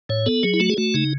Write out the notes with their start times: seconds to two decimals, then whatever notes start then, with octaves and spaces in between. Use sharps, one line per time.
0.09 A2 C#5
0.26 B3 A4
0.43 F#3 G#4
0.54 E4
0.60 A3 F#4
0.70 G#4
0.78 A3 F#4
0.94 C#3 D#4